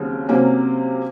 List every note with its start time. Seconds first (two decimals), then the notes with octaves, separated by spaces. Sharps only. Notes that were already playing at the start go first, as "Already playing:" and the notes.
Already playing: D#2 C#3 F#3 C4
0.29 C3 F#3 A#3 C#4